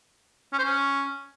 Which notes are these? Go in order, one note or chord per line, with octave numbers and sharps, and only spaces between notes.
C#4
C5
C#4